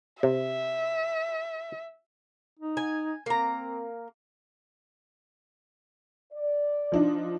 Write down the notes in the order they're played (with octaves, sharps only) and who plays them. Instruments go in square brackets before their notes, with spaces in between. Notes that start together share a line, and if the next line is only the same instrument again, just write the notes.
[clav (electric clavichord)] C3 [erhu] E5
[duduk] D#4
[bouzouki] G#5
[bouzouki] A#3 A#5 [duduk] C4
[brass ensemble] D5
[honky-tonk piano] F3 D4 D#4